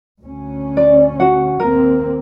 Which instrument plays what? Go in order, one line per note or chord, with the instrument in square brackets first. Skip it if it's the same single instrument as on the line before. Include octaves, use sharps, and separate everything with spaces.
[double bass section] D2 C#4
[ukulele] D5
F#4 F#5
[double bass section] D#2 A#3 C4 [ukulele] A#4